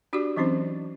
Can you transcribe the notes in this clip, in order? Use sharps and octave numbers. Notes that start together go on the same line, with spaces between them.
D4 F#4 G4 D5 D6
E3 F#3 C4 C#4 D#4 C5